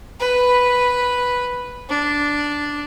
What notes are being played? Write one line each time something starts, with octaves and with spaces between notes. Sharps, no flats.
B4
D4